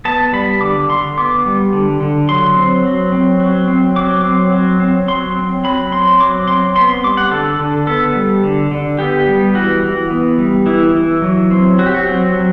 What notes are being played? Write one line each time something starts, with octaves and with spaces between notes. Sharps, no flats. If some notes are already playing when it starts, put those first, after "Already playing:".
B3 A5
G3 B5
D3 D6
D3 C6
B3 D6
G3
D3
D3
F#3 C6
C4
F#3
C4
F#3
C4
F#3 D6
C4
F#3
C4
F#3 C6
C4
F#3 B5
C4 C6
F#3 D6
C4 C6
B3 C6
C6
G3 D6
F#5
D3 A4
D3
B3 A4
G3
D3
D3
B3 G4
G3
E3 F#4
E3
B3
G3
E3 E4
E3
F#3
C4
F#3 F#4
G4
F#4
C4
F#3